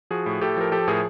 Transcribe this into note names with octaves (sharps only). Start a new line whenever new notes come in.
F3 F#4 G#4
A2
A2 G4 A4
F3 A#4
F3 G4 A4
A2 G#4 A#4